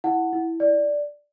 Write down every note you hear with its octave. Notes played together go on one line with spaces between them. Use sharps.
E4 F#5
E4
D5